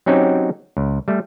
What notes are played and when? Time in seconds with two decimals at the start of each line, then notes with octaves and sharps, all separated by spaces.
0.06 F#3 C4 C#4 D#4 F#4 G4
0.77 C#2
1.08 G3 A3